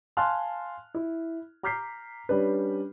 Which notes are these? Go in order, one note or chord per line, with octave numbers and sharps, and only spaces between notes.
F5 G#5 A5 C6 F6 F#6
E4
A#5 D6 F6 G6 B6 C7
G3 C#4 D4 B4